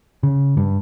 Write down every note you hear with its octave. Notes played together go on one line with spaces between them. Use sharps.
C#3
G2